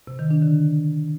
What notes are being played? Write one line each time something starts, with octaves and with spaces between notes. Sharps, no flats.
C3
D#3
D4
D3